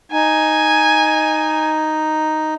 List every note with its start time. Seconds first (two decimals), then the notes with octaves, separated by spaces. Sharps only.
0.12 D#4 G#5